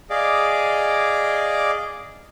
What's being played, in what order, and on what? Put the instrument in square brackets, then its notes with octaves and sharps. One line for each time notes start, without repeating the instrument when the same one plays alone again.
[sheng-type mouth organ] G#4 D5 D#5 F5 D6